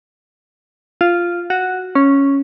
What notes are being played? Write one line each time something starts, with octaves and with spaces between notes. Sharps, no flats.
F4
F#4
C#4